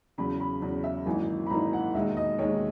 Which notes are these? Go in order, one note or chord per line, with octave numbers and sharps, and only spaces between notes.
E2 C#3 F#3 B5
B5
E2 C#3 F#3
E5
G#1 F#2 E3 A#3 D#4 G#5
B5
G#1 F#2 E3 A#3 D#4 A#5
F#5
E1 D#2 D#3 G#3 D#4 E5
D#5
E1 D#2 D#3 G#3 D#4 C#5